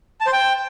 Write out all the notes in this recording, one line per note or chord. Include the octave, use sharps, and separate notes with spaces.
A5
C5
G5